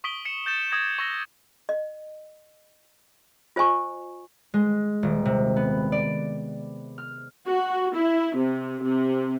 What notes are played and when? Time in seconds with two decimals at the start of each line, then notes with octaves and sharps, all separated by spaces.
0.04 C#6 D#6 B6 D7 G7
0.25 B6 C#7 E7
0.46 G6 A6 E7
0.71 D6 D#6 G#6 A#6 E7
0.99 C#6 E6 A#6 G7
1.69 D#5
3.56 F4 C5 D#5 G#5 C#6
4.54 G#3
5.03 D#1
5.25 C3
5.56 B3
5.92 D5
6.98 F6
7.48 F#4
7.96 E4
8.35 C3
8.83 C3